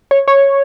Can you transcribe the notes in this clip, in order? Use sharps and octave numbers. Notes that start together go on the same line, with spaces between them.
C#5
C#5